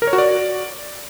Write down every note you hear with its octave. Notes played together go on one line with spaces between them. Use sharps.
A#4
C#5
F#4
D5